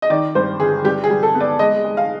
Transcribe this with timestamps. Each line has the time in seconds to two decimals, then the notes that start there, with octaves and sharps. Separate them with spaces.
0.02 D#5
0.10 D#3 D5
0.35 G2 C5
0.60 G1 G#4
0.84 G3 G4
1.04 G#4
1.10 G3
1.23 A4
1.35 B3
1.40 D5
1.59 G#3 D#5
1.84 G#3
1.97 F5